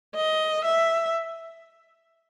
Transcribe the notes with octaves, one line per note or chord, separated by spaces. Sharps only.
D#5
E5